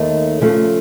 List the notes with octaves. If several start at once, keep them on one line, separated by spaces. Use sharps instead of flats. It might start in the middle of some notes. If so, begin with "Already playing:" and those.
Already playing: D#2 D#3 A3
C#3 F3 A3